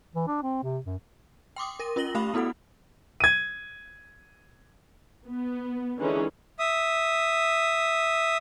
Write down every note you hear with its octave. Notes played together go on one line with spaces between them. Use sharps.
E3
D4
C4
C3
F#2
G5 C6 D6 D#6
A#4 A#6 D#7
C#4 F4 A#4 A#6 F#7 G7
A3 G4 F5 B5 D#6 F7
B3 E4 F#4 A4 F#5
G#6 D#7
B3
D3 E3 G#3 C#4 D#4 G#4
E5 D#6